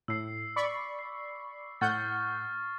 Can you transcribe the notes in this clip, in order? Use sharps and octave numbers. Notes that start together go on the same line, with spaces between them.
A2 E6 C7
D5 B5 C#6
C7
A2 F#5 C#6 F6 G6 A6